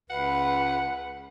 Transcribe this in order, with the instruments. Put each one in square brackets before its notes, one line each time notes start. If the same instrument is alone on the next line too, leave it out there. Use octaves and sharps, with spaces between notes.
[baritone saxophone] C#2 [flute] B4 [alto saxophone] F#5